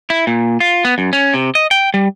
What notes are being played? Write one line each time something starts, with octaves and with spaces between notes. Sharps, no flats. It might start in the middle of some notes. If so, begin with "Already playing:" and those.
E4
A#2
F4
B3
F#2
C#4
C3
D#5
G5
G3